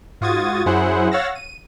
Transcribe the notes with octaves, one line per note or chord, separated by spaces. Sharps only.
G#2 F4 F#4 D#6 G#6 A6
F#2 F#3 E4 G#4 C5 F#5
C#5 F5 F#5 E6 A6 A#6
D#7